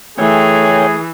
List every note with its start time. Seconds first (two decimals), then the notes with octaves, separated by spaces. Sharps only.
0.18 E3 A3 G#4 C#5 G5 G#5